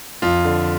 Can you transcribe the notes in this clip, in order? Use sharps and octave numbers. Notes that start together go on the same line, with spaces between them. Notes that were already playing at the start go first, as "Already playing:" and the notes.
F2 F4
D3